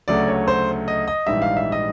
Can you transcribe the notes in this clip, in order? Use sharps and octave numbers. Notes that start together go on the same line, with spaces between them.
D2 C#3 F#3 A3 D5
C#5
C5
D#5
D#5
A#1 G#2 E3 G3 E5
F5
E5
D#5